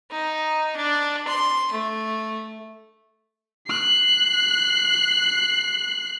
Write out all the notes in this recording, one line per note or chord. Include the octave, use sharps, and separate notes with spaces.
D#4
D4
C6
A3
F#6 C7